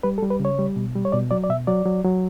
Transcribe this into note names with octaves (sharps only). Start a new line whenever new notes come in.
G3 B4
A4
G3
B4
C#3 C#5
G3
B2
G3
C#5
B2 D5
F#3 D5
D5
B2 E5
F#3 D5
F#3
F#3